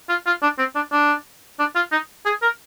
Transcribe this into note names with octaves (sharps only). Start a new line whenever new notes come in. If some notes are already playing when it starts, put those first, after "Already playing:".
F4
F4
D4
C4
D4
D4
D4
F4
D#4
G#4
A#4